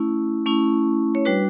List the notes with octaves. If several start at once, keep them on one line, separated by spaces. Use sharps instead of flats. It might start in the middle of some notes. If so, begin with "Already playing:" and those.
Already playing: A3 C#4 E4
A3 C#4 E4
C#5
G3 D4 F#4 B4